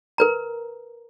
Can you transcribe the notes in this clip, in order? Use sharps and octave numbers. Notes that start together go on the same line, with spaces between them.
A#4 B4 A#5